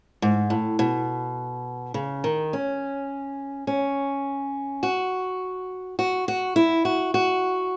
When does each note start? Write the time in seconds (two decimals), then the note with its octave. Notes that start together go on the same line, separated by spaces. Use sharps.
0.22 G#2
0.50 A2
0.79 B2
1.94 C#3
2.24 D#3
2.53 C#4
3.67 C#4
4.83 F#4
5.99 F#4
6.28 F#4
6.56 E4
6.85 F#4
7.14 F#4